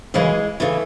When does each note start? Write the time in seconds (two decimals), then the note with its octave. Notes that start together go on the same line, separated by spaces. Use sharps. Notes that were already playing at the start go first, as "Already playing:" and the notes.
0.14 F#2 C#3 E3 G#3
0.60 C#3 E3 A3